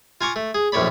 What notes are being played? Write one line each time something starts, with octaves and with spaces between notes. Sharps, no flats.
F4 G#5 A#5 C#6 D6
A3
G#4
A#1 F#2 A2 C#5 D5 B5